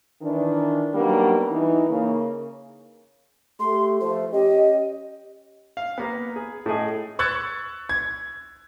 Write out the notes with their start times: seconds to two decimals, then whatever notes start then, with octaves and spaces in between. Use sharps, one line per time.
0.22 D#3 E3 D4
0.95 F#3 G3 A#3 B3 D4 D#4
1.50 E3 D#4
1.90 C#3 A#3
3.60 A3 G4 C6
4.01 F3 A3 C5
4.32 C#4 G4 D#5
5.77 F5
5.98 A#3 B3
6.36 G#4
6.66 A2 A3 G#4 D#5
7.19 C#6 E6 F#6 G#6 A6 C#7
7.89 G#6